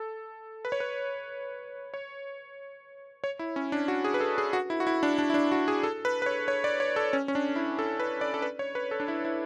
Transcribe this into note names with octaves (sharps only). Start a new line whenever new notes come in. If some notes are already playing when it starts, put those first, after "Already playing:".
Already playing: A4
B4
C#5
B4
C#5
C#5
E4
C#4
D4
F#4
G#4
B4
A4
G#4
F#4
E4
F#4
E4
D4
D4
E4
D4
F#4
G#4
A4
B4
B4
C#5
C#5
D5
C#5
A4
C#4
C#4
D4
E4
A4
B4
D5
A4
B4
C#5
B4
A4
D4
E4
E4